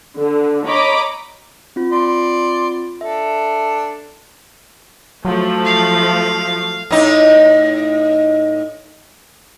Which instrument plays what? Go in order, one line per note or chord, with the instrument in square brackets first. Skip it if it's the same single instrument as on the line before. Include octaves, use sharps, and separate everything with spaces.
[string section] D3
C#5 D#5 A#5 B5 D6
[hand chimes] C4 F4
[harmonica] D5 C6
[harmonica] D4 A4 [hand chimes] E5
[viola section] F3 A3 [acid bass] F#3
[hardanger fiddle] F5
[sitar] A2 D#4